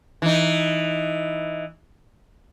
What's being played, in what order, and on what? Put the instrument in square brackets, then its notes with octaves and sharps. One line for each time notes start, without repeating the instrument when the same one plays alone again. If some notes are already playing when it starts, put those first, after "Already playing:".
[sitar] E3 D#4